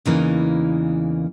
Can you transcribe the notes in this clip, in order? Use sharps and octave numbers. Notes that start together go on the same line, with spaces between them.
E2 C#3 E3 A#3 D#4